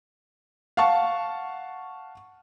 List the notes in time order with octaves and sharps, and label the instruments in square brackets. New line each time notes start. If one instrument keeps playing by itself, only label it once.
[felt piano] F5 F#5 A5 C#6